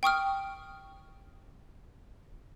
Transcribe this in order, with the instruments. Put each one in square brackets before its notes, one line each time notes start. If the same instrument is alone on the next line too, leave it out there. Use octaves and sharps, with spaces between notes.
[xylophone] G5 C#6 D#6 F6